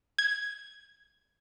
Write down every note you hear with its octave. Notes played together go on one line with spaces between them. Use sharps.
G#6